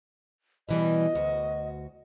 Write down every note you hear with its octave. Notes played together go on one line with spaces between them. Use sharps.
B2 E3 G3 D#5
D2 F#4